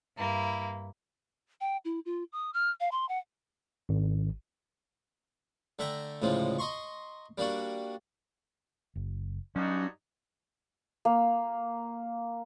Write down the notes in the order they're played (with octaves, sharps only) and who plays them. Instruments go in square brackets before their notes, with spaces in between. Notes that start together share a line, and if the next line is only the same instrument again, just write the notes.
[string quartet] G2 A#3 E4
[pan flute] G5
E4
F4
D#6
F6
F5
C6
F#5
[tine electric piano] G#1
[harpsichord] D3 A3 E5 G5 A#5
D2 A2 C#3 F3 G#3
D#5 A#5 C6 C#6
G3 A#3 D4 F#4
[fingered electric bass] F#1
[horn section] G2 D#4 F#4 [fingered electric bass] F#3 [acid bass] C#4
[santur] A#3